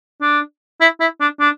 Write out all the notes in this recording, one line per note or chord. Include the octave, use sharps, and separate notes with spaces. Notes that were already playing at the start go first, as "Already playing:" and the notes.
D4
E4
E4
D4
D4